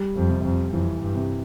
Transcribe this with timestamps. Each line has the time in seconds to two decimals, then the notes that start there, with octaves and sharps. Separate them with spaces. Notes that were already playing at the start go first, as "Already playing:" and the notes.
Already playing: G3
0.16 F2
0.29 C3
0.44 F2
0.73 F2 E3
1.01 G2
1.15 C3